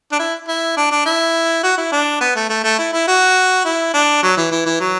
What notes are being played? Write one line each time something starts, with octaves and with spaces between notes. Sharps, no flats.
D4
E4
E4
D4
D4
E4
F#4
E4
D4
B3
A3
A3
A3
E4
E4
F#4
E4
D4
F#3
E3
E3
E3
F#3